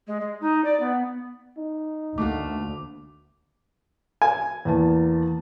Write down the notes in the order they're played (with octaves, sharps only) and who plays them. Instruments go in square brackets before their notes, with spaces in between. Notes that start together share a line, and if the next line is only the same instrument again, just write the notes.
[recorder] G#3
G#3
D#4
D5
B3
[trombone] D#4
[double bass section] D2 [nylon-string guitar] A3 A#3 F#4 [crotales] D6
[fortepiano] G#5
[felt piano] E2 A#3 A5